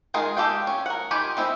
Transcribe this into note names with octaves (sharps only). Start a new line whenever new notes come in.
D#3 G#3 F4 G#4 A#4
G#3 G4 A4 F5 G5
C#4
A#4 F#5
D#3 F4 G4 G#5 B5
G#3 C4 E4